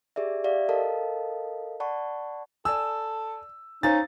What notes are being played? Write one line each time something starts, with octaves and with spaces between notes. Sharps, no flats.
G4 G#4 D5 E5
G4 D5 E5 F5
A4 A#4 D#5 F5 A5
D5 F#5 A5 B5 C#6
A4 D5 G#5 E6
C#4 D#4 C5 F5 G#5 A6